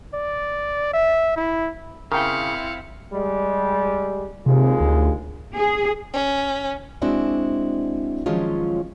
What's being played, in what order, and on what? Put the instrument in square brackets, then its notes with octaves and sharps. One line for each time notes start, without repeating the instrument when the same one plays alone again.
[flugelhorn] D5
E5
E4
[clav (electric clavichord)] C#3 [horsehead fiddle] C4 E4 [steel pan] A#4 G5 [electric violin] F5 C#7
[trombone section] G3 G#3
[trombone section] D#2 G#3 F4 [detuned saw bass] C3
[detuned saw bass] D2
[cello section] G#4
[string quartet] C#4
[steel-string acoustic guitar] G#3 C4 D4 E4 F#4
D#3 F3 F#3 G#3 C#4 F4